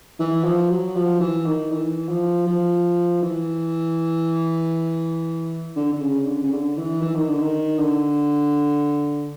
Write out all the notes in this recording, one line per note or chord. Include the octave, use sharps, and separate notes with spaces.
E3
F3
F#3
F3
E3
D#3
E3
F3
F3
E3
D3
D3
C#3
D3
C#3
D3
E3
E3
D#3
D3
D#3
D3